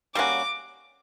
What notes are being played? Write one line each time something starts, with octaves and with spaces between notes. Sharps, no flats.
G3 A#3 C#4 F#4 D6